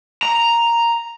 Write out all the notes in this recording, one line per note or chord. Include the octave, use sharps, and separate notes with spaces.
A#5